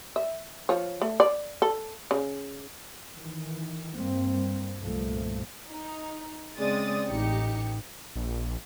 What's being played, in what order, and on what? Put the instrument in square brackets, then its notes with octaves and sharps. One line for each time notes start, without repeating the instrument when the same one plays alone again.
[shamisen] E5
F3 C#5
A3
D5
A4
C#3
[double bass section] D#3 E3
G2 G3 A#3 C4
C2 G2 A#2 F3 A3
[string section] D#4
C#3 G#3 C4 D5 D#6 A6
A1 D#4 G4 C#7
[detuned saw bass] A#1